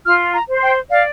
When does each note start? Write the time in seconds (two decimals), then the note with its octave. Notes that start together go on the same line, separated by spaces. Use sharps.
0.05 F4 F6
0.34 A#5
0.49 C5
0.63 G5
0.90 D5 F5